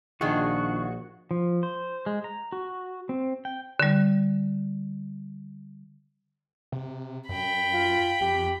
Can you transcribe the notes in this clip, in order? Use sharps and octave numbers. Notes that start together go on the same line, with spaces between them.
A#1 D#3 D4 F4 F#4 G#4
F3
C5
G#3
A#5
F#4
C4
G5
D3 G3
C3
F#2 G5 B5
F4
F2 G4